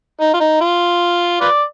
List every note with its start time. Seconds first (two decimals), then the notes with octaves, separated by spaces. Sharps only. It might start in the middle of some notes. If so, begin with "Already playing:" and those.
0.21 D#4
0.34 F4
0.40 D#4
0.61 F4
1.41 F4 B4 D5